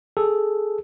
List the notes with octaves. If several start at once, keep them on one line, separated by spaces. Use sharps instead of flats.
G#4 A4